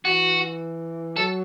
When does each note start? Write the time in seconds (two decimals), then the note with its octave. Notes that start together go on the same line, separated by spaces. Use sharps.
0.05 E3 F#4
1.17 F#3 A4